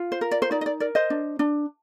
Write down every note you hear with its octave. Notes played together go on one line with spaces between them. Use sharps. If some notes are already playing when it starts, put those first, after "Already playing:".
Already playing: F4
C5
A#4
D5
C5
D#4 D5
D#5
D5
A#4 D5
C5 D#5
D4
D4